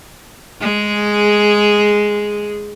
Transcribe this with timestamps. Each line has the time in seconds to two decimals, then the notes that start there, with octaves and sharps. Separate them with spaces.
0.60 G#3 G#4